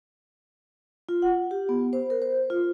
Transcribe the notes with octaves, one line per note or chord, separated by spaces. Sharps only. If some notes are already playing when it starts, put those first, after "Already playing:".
F4
F#5
G4
B3
C5
A#4
C5
F4